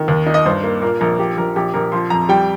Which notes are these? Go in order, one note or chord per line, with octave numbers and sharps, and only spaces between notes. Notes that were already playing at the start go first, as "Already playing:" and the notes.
Already playing: D#3
D#2
D#4
D#5
G2 C5
A#3
A#2 A#4
A#1 A#4
F3 G4
A#1 A#4
A#1 G4
A#1 A#4
F3 C6
F2 A#5
G3 G5